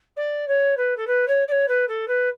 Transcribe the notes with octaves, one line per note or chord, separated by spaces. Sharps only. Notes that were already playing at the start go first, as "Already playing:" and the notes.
D5
C#5
B4
A4
B4
C#5
D5
C#5
B4
A4
B4